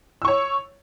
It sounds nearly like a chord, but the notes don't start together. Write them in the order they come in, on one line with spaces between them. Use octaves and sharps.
E6 C#6 C#5